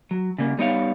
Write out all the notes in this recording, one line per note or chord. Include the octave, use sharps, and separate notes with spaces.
F#3
C#3 G3 A#3
G3 B3 D#4 C#5 D#5 F5